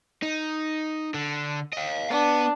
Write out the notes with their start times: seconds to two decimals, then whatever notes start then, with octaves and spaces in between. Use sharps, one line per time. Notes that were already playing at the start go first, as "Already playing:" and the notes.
0.23 D#4
1.14 D3
1.73 D#5 F5
2.11 B3 D4